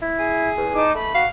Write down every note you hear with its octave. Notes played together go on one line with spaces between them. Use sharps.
E4
G#4
E2
D#4 A5 D6
A3 B5
F#4 F5